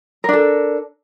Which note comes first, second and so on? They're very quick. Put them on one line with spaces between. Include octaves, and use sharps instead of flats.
A#4 D4 A4